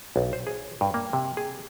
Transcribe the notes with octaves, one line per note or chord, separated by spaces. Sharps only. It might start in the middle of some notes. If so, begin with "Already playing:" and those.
B1
C5
G#4
G2
A#3
C3
G#4